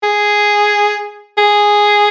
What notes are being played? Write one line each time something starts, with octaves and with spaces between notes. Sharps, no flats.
G#4
G#4